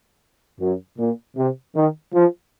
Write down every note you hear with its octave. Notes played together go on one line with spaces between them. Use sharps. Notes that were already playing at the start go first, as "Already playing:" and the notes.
F#2
A#2
C3
D#3
F3